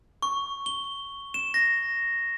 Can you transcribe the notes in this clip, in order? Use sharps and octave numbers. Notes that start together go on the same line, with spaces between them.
C#6
G7
E7
A#6